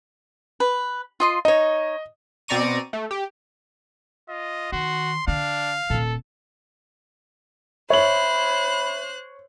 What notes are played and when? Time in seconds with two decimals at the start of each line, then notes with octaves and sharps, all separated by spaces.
0.60 B4
1.20 F4 D#5 C6
1.45 D#4 C#5 D#5
2.48 B2 C4 D5 A#5 C#6 D#7
2.93 A3
3.11 G4
4.29 F4 D#5
4.72 D#3 F#4 C6
5.28 D3 D4 F5
5.90 D#1 A#2 A4
7.90 C5 C#5 E5 B5 F#6 F#7